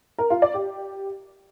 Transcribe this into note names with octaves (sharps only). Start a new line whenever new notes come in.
A#4
F4
D5
G4